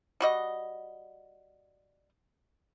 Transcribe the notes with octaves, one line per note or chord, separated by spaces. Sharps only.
G3 F#4 D#5